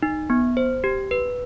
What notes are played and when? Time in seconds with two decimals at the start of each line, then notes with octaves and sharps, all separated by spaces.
0.02 D#4
0.30 B3
0.57 C5
0.84 G4
1.11 B4